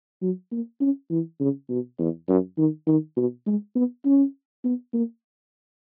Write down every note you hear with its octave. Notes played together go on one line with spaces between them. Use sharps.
F#3
A#3
C#4
E3
C#3
B2
E2
F#2
D#3
D#3
B2
G#3
B3
C#4
B3
A#3